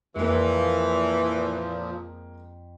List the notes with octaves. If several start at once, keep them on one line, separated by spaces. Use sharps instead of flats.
F2 A#2 E3 F3 G#3 A#3